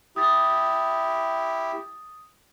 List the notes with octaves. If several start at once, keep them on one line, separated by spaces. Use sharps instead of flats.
E4 G4 D#6 A6